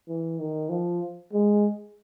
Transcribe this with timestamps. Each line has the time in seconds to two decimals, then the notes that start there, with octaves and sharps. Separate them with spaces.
0.08 E3
0.39 D#3
0.69 F3
1.33 G#3